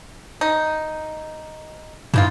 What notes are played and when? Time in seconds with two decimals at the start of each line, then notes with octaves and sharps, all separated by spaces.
0.41 D#4
2.14 G2 E3 D#4 F4